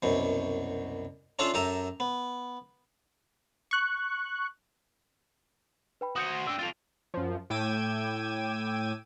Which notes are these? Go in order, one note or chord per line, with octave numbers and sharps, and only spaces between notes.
C2 F#2 B2
C#4 D4 F4 A4 E5 F5
F#2 G4 A4 E5 A#5 D#6
B3
C#6 F#6
B4 G5 B5
F#4 C5 D#6 G6 C#7
D4 G5 E6
F4 A4 A6 D7 F7
F#2 F3
A2 G5 D6 E6 G#6 D#7